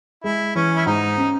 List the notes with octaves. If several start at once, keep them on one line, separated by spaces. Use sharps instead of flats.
G#3 E4
E3 C#4
E4
G#2 D#4
C#4